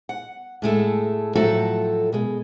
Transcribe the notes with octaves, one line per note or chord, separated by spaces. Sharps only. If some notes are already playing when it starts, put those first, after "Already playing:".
F#5
A2 G#3 A3 A4
A2 F3 F#3 A3 F#4 A4
B2 G#3